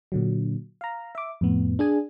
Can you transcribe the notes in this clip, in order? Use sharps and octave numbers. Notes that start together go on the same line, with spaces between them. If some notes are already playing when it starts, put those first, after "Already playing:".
A#2 D3 F#3
F5 A#5
E5 D6
F2 A2 B3
D4 G#4 G#5